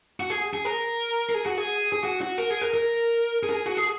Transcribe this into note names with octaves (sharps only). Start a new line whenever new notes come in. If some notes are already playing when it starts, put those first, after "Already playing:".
F#4
G#4
G#4
A#4
A#4
G#4
F#4
G#4
G#4
F#4
F#4
A#4
G#4
A#4
A#4
G#4
A#4
G#4
F#4
G#4